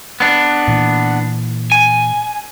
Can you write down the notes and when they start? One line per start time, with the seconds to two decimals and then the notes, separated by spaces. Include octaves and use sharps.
0.20 B3 D4
0.68 A#2 E3
1.72 G#5